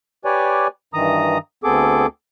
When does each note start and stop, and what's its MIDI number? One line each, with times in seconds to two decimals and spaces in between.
0.25 0.67 67
0.25 0.67 71
0.25 0.67 73
0.25 0.67 74
0.25 0.67 80
0.94 1.38 43
0.94 1.38 51
0.94 1.38 52
0.94 1.38 82
0.94 1.38 87
1.64 2.06 38
1.64 2.06 59
1.64 2.06 60
1.64 2.06 68
1.64 2.06 69
1.64 2.06 86